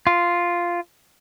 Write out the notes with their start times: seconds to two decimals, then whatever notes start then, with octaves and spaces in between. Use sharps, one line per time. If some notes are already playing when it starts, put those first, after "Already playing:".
0.07 F4